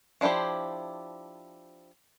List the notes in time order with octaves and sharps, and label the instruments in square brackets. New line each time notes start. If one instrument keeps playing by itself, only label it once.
[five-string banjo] F3 D4 E4 G4 C5